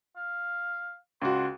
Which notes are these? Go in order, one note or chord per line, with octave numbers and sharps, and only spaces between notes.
F5
C#2 F#4 C6